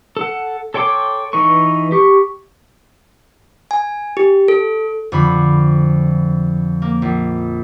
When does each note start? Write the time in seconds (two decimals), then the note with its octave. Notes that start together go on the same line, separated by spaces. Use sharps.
0.17 A4 F#5
0.74 A4 C#5 G5 C6 D6
1.33 E3 D#4 B4 C#6
1.92 G4 C#6
3.71 G#5
4.17 G4
4.48 A4
5.12 F2 D3 B5
6.82 A#3
7.02 A#1